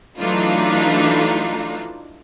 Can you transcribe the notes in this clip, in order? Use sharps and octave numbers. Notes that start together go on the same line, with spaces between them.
E3 F#3 A3 D4 D#4 F4